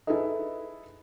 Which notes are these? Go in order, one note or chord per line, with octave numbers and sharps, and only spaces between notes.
D#4 E4 G#4 A4 B4 D#5